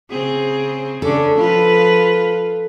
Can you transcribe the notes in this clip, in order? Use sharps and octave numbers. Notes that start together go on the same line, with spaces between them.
C#3 C4 G#4
C#3 C#4 D4 A4
F3 F4 B4